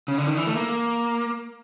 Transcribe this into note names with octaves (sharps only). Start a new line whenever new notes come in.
C#3
D3
D#3
E3
A3
A#3